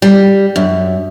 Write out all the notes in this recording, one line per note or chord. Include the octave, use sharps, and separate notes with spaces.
G3
F#2